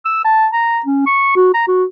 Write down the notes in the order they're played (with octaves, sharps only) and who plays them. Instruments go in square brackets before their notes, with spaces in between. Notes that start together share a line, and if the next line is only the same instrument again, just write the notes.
[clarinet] E6
A5
A#5
C#4
C#6
F#4
A#5
F#4